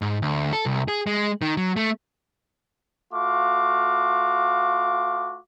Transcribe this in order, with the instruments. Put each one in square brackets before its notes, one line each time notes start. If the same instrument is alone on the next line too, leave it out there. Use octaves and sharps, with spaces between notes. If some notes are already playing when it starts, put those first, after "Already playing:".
[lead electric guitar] G#2
D2
A4
C2
G#4
G#3
D#3
F#3
A3
[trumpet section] A3 F4 F#4 F5 D6